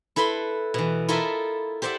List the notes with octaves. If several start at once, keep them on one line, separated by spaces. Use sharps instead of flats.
E4 A4 B4 B5 C6
B2 E3
E4 F4 A4 A#4 D#5 E5
G4 C5 D5 E5 F#5